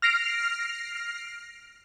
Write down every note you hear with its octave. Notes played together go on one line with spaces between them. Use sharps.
F6 A#6 C7 D7 F7